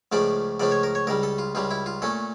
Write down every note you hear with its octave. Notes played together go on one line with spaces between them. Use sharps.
C#2 C#3 F3 A3 D4 D5
C#2 C#3 F3 A3 D4 D5
C#5
A#4
C#5
C#2 C#3 G3 A#4
A4
F4
C#2 C#3 G3 F4
E4
F4
A#2 A3 C#4 A4